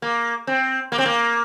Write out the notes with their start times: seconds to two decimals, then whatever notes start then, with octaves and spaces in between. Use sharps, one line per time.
0.02 A#3
0.47 C4
0.92 A#3
0.98 C4
1.06 A#3